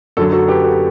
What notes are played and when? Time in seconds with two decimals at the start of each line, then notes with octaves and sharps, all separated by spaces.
0.17 F#2 D3 F#3 F#4 A4
0.33 F#4 A4
0.48 G4 B4
0.64 F#4 A4